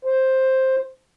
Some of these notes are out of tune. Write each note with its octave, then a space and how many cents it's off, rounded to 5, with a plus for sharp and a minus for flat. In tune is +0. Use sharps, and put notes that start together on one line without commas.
C5 +5